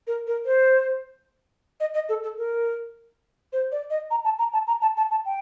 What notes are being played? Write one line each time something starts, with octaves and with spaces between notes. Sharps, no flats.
A#4
A#4
C5
D#5
D#5
A4
A4
A#4
C5
D5
D#5
A#5
A5
A#5
A5
A#5
A5
A5
A5
G5